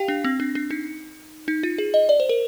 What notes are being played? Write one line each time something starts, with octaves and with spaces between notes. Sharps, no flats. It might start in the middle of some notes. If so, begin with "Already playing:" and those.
Already playing: G4 F5 G5
D4
C4
D4
D4
D#4
D#4
F4
G#4
D#5
D5
C5
A#4